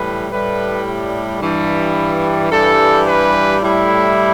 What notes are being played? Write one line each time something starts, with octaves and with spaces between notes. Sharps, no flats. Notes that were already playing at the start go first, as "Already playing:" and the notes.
Already playing: A2 E3 G3 B4
A2 G3 B4
G2 E3 G3
G2 E3 G3 A4
B4
A2 G3 E4